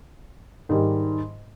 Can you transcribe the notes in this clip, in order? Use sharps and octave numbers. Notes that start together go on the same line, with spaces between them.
G#2 D#3 G3